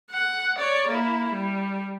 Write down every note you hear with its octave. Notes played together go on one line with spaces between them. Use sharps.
F#5
C#5 D5
A#3 E4
G3